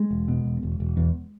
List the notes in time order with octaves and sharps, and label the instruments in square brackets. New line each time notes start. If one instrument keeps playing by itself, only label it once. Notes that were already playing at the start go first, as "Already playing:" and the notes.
Already playing: [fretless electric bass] G#3
E1
B2
E1
E1
E1
E2